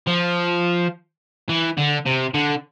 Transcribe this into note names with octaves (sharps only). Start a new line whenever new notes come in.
F3
E3
D3
C3
D3